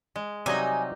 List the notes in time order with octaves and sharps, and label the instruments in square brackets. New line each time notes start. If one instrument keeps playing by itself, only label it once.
[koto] G#3
[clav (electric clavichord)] C3 F#3 D#5 [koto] G3 D#4 [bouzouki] G#5